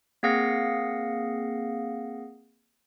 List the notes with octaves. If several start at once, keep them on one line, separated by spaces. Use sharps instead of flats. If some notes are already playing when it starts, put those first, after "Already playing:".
A#3 C4 G#4 F5 F#5 A#6